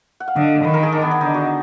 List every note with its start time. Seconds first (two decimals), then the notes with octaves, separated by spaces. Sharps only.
0.20 F#5
0.28 F5
0.36 D3 D#5
0.64 D#3 B4
0.74 A#4
0.83 G#4
0.92 D4
1.02 B3
1.11 D4
1.21 D3 D#4
1.34 F#4